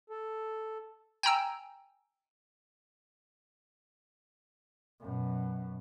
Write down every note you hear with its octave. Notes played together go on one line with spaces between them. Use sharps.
A4
G5 G#5 A#5 E6
F#2 B2